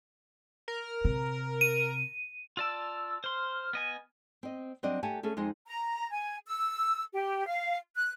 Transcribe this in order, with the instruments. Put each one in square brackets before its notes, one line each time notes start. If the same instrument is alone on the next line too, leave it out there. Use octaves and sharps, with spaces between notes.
[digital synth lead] A#4
[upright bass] C3
[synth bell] D#7
[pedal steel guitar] F4 D5 A5 [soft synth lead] E6
[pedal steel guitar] C5 C6 [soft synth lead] F6
[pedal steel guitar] B3 D#5 G#5
[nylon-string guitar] C4 D#5
F#3 G3 C4 D4 D5 D#5
A3 G4 F#5 G#5 A5
A3 C#4 G#4 A4
F2 G#3 D#4 G#4 C5
[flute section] A#5
G#5
E6
G4
F5
F#6